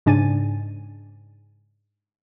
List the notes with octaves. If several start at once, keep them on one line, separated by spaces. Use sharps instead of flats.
G#2 C#3 D4 G#5 A6 D#7